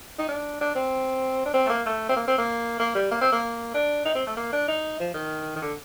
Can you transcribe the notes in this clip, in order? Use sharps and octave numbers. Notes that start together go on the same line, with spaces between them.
D#4
D4
D4
C4
D4
C4
A3
A#3
A3
C4
A#3
C4
A#3
A#3
G3
A#3
C4
A#3
D4
D#4
C4
A3
A#3
D4
D#4
F3
D#3
D#3
D3